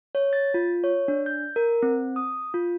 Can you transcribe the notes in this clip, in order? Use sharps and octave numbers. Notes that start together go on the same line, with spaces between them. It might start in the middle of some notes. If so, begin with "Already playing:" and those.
C#5
A6
F4
C#5
D4
G6
A#4
C4
D#6
F4